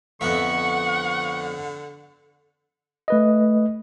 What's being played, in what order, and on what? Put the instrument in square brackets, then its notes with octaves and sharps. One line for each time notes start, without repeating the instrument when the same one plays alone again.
[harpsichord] F2 B3 E5 [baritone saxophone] D3 [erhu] F#5 [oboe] C#6
[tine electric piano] A3 B4 D#5